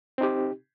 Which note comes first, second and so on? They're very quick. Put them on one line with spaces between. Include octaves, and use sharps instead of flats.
C4 D#4 G4